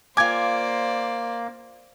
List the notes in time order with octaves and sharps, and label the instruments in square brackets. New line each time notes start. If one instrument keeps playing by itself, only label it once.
[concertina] A#3 [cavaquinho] F4 G#5 [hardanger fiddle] C5 D5 [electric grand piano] D6 G#6